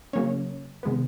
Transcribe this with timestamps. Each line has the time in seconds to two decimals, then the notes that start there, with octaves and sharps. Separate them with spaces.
0.13 C#3 F#3 A#3 C#4 C#5
0.83 C3 D#3 G#3 B3